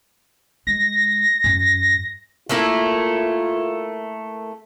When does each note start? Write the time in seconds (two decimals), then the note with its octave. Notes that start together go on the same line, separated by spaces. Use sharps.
0.67 G#3 A#6
1.44 F#2
2.49 A3 A#3 E4 F4